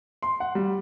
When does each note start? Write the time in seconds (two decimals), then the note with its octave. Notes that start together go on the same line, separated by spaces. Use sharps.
0.22 C6
0.40 F#5
0.55 G3